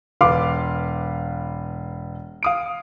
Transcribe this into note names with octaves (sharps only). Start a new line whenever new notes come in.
E1 B4 F5 C6 D6
F5 D#6 D7